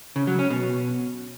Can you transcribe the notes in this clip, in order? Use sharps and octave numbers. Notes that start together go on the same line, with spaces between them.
C#3
F#3
C#4
B2